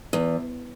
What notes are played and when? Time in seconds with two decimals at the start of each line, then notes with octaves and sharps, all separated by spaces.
0.13 E2